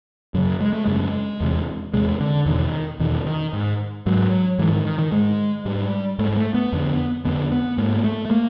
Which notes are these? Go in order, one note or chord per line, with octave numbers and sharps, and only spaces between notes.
F#2 C#3 F#3
G#3
A3
F#2 C#3 G#3
E2 C3
E2 C3 G#3
D3
E2 B2 D#3
E2 B2 D#3
D#3
G#2
G#2 F#3
G#2 E3
D#3
D#3
D#3
G#2 G#3
G#2 G3
G#2 A3
A3
B3
F2 D3
F2 D3 B3
B3
G#2 A#3
A#3
A3
A3
A#3